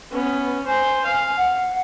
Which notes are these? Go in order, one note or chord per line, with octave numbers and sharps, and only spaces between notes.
B3 C#4
C5 G#5
F5
F#5